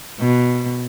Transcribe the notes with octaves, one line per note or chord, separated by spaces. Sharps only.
B2